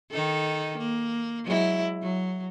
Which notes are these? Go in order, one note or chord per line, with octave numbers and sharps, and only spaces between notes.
D#3 D#4 A4
A#3
F#3 G#3 E4
F#3